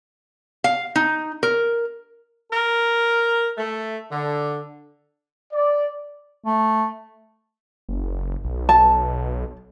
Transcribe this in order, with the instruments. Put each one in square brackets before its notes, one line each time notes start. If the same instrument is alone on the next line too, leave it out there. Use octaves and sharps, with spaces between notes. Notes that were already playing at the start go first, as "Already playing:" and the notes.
[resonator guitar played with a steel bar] F5
D#4
A#4
[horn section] A#4
A3
D3
[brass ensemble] D5
[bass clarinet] A3
[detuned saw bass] F#1
B1
[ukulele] A5